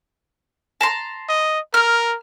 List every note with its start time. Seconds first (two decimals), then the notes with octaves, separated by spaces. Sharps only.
0.81 A5 A#5 C6
1.29 D#5
1.74 A#4 F6